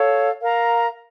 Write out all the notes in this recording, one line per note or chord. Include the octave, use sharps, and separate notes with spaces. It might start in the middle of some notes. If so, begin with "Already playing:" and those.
Already playing: A4 C#5 F5
A#4 F5 A#5